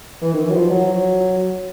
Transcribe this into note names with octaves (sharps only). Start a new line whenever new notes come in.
E3
D#3
E3
F#3
F3
F#3